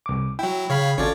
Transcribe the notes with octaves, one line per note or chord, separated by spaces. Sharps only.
C2 D6
F#3 E4 G5
C#3 C#5 F5 B5
G#1 C#4 F4 A4 C#5 D5